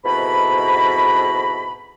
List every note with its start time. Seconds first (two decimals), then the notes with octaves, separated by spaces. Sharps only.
0.05 F2 G#2 B2 E3 A#5 B5